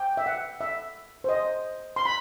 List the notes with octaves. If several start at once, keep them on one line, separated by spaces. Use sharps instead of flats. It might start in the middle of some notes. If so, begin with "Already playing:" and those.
Already playing: G5
E5
F#5
E5
C5
D#5
C6
B5